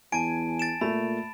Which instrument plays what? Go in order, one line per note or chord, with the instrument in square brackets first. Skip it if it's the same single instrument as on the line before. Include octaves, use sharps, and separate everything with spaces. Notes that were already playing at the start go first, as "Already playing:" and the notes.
[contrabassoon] E2 [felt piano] G#5 [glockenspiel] A5 D7
[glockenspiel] A6 D7 E7
[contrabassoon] A#2 [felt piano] A3 [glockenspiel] B5